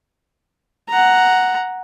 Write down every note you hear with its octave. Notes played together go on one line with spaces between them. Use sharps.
F#5 A#5